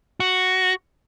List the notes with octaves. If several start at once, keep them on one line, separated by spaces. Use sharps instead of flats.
F#4